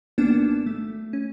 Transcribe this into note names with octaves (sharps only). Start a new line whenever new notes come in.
G#1 A#3 B3 D4 D6 E7
A3
C#4